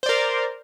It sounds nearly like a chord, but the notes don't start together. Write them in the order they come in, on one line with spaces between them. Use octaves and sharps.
C5 D5 A#4